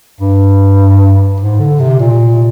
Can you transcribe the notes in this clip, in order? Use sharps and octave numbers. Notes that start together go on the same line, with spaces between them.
G2
G#2
D3
C3
A#2